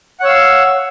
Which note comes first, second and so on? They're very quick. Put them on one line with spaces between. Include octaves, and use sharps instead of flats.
F#5 C#5 E6 F5